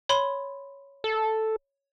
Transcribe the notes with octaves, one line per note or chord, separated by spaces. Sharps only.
C#5 B5 C6
A4